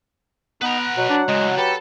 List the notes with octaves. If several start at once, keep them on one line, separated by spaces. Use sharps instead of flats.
B3 D#4 B4 A#5
F#5
B2 F#3
D4
A2 C#3 G#3
G4 A4 B4